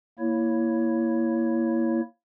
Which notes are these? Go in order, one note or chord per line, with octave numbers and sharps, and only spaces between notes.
A#3 E4 C#5